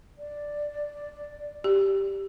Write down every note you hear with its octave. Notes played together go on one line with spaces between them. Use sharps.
D5
G4